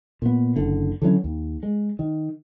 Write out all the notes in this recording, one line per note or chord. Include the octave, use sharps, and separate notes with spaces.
A#2 B3
F#1 D3
D3 E3 F#3 C#4
D#2
G#3
D#3